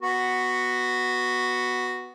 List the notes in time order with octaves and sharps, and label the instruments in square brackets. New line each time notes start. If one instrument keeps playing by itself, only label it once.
[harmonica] B3 F#4